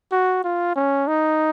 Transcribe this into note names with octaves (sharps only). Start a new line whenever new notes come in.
F#4
F4
C#4
D#4